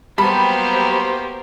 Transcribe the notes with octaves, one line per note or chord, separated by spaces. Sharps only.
F#3 G3 A#3 B3 G4 C5 A5 B5